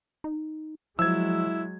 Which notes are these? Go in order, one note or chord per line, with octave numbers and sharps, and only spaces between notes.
D#4
F3 F#3 G#3 E4 E6 G#6